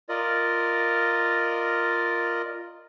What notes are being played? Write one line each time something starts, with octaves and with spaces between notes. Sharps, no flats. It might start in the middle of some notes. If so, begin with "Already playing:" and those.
F4 A#4 D5 D#5